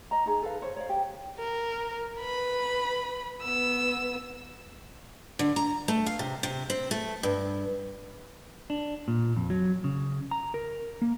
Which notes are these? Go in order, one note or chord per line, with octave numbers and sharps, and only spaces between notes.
D#5 A#5
D#4 G#4 A#5
A4 B4 F5
C5 C#5
C#5 D5 F5
G4
A#4
B4 B5
B3 E6
D3
A#5
A3
F5
C3
C3
C4
A3
G2
D4
A#2
F2
F#3
C#3
A#5
A#4
A#3